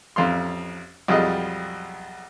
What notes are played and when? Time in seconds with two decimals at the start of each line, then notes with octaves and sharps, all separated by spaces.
0.16 A1 F2 F5 C6
1.08 B1 F2 G3 F4 G#4 D#5